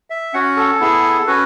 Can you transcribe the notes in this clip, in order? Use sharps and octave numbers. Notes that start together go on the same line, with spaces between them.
E5
C#4 F#4 F#5
A4
B3 E4 G#4
C#4 F#4 B4